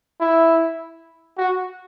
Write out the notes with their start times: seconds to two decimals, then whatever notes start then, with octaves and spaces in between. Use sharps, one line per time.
0.20 E4
1.38 F#4